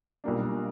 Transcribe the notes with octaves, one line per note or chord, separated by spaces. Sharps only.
B1 A#2 G3 A#3 D4